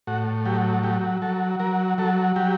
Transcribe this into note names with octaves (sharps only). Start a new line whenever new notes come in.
A2 F#4
F#3 G4
F#3 G4
F#3 A4
F#3 A#4
F#3 A4
F#3 G4